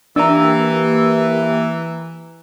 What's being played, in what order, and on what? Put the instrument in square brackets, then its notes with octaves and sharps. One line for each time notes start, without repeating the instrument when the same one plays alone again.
[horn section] E3 [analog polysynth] A#3 G4 [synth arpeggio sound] D4 [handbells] A#5 E6